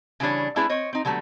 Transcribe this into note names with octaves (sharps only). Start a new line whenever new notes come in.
C#3 E3 G3 D4 C#5
A3 C#4 D4 E4 G#4 B4
C4 C#5 D#5
C4 D#4
D3 F#3 G3 A3 B3